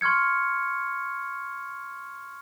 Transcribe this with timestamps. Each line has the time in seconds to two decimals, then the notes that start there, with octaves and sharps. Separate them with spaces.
0.01 C6 C#6 F6 G#6 C#7